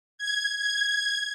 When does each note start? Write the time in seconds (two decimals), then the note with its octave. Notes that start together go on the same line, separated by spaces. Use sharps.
0.18 G#6
0.58 G#6